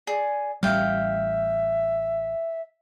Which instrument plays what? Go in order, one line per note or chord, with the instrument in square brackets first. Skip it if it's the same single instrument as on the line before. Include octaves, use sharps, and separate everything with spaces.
[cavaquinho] G#4 [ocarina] D5
[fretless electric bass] A1 G3 [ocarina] E5 [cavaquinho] F5 G5